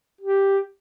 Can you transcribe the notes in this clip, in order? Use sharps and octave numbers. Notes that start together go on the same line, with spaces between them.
G4